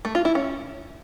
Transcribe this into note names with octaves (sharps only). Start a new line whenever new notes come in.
A3
F4
E4
C#4